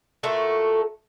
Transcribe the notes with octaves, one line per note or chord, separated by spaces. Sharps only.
A#2 A3 F#4 A4